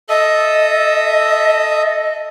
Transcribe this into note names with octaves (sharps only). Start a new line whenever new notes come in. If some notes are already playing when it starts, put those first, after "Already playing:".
A4 D#5 E5 D#6